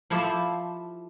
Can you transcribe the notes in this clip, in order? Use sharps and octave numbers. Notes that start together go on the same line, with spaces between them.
F3 E4 G4 A4 C5